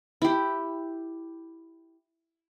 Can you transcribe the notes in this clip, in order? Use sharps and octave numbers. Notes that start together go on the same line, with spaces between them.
E4 G4